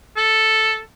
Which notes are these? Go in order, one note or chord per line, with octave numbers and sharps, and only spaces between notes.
A4